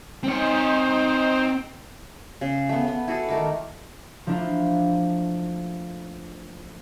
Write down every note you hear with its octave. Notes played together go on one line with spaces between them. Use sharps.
C4 D#4 C5 C#5
C#3
A3 B3
B3
E4 F#4 G#4 A4
D#3 A3 A#4 D6
F3 A3 A#3 D4 E4 F4